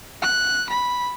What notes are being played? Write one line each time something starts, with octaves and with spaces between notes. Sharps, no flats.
F#6
B5